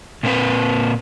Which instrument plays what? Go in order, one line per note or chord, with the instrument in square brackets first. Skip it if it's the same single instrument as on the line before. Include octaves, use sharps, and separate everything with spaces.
[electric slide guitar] A#2 A#3 C4 B4